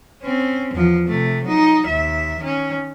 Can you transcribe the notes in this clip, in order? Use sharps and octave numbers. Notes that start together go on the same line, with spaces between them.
C4 C#4
E2 F3
C3 A3
F#3 D#4
D#2 E5
D#3 C#4